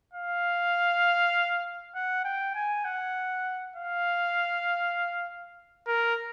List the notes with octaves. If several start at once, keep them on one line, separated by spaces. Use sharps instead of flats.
F5
F#5
G5
G#5
F#5
F5
A#4